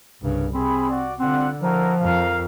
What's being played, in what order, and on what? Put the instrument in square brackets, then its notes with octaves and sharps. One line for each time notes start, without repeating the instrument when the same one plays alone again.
[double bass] C2 C#3 [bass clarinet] G2
[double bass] C3 [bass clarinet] C4 [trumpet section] G#4 B5
[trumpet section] F#4 D5
[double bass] D3 [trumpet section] G3 F4 F#5 [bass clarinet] C4
[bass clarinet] F3 [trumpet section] E4 F#4 A#4
[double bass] F2 [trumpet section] A#4 F5